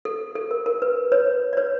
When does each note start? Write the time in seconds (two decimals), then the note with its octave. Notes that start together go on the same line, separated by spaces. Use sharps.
0.05 A4
0.35 A4
0.51 A#4
0.66 A#4
0.82 B4
1.12 B4 C#5
1.53 D5
1.57 B4 C#5